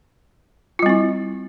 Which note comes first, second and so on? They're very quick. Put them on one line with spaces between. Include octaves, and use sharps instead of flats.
F4 G3 C4 E4